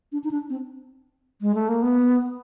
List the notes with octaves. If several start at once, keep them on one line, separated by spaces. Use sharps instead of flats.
D4
D#4
D4
C4
G#3
A3
A#3
B3